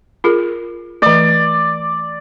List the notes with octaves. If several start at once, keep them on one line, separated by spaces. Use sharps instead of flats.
F4 G#4 A#4
E3 A3 D5